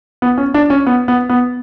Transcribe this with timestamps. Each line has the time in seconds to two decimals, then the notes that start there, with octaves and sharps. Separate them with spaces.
0.22 B3
0.38 C#4
0.54 D4
0.70 C#4
0.87 B3
1.08 B3
1.29 B3